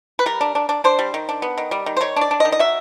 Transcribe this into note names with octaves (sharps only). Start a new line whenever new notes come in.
B4
G3 A#4
D4
D4
D4
D4 C5
G3
D#3
D4
B3
D#3
G3
D#3
C5
D#3 C#5
D4 D5
D4
D#5
D#3
D#5
F#3 E5